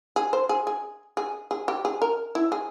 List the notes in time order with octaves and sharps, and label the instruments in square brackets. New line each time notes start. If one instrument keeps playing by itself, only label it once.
[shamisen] G#4
C5
G#4
G#4
G#4
G#4
G4
G#4
A#4
E4
G#4